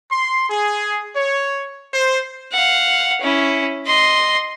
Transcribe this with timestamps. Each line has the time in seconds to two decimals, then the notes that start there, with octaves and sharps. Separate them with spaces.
0.10 C6
0.49 G#4
1.16 C#5
1.93 C5
2.53 F5 F#5
3.21 C#4 E4
3.87 D#5 C6